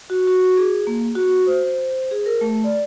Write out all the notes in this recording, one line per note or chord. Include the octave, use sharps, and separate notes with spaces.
F#4
F#4
G#4
A#3
F#4
C5
G#4
A#4
A3
D5